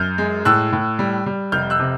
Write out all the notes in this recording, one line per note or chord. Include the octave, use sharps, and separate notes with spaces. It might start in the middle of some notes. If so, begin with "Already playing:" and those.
Already playing: F#2 F6 G6
G#3
A2 E6 F#6
A2
G3
G3
F1 F6 G6
E6 F#6
C3